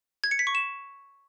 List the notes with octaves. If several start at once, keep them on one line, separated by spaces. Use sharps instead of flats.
G#6
C#7
B6
C#6
E7